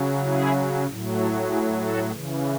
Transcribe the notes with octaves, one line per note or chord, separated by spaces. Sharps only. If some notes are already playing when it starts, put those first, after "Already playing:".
Already playing: C#3 F#3
E4 G#4
A2 F#3
F#4 A4
E4 G#4
F#4 A4
C#3 E3